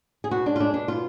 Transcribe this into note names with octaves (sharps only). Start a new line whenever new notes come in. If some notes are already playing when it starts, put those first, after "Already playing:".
G#4
B2 F#4
G#3 D4
F4
G#3 D4
B2 D4
B2 F4